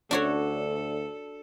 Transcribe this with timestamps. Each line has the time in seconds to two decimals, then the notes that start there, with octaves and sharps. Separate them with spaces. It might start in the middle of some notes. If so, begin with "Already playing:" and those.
0.11 D2 D4 F#4 A4 C#5